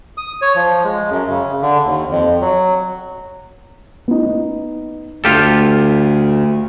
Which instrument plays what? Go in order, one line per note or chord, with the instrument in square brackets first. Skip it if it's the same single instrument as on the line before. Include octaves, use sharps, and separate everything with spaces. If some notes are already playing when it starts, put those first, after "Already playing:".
[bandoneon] D#6
C#5
F3
G#3
F#2
C#3
D3
D#2
F2
F#3
[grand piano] B3 D#4
[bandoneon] D2 [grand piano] A3 F6 [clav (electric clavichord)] F4 G4 A4